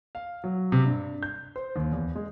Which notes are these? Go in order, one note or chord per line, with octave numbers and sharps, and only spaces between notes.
F5
F#3
C3
G2
G6
C5
D#2
E2
G#3